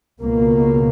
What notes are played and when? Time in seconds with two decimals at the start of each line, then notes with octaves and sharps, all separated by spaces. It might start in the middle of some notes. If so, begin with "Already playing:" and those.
0.21 C#2 B2 A#3